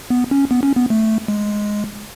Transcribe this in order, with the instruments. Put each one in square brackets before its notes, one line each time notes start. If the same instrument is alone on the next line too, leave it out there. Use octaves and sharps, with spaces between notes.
[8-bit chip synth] B3
C#4
B3
C#4
B3
A3
G#3